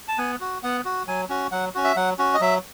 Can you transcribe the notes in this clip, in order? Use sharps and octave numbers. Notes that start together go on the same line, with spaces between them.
A5
B3 G#5
F#4
B3 F#5
F#4
F#3 G#5
C#4 F#4
F#3 F#5
C#4 F#4
E5
F#3 F#5
C#4 F#4
D#5
F#3 E5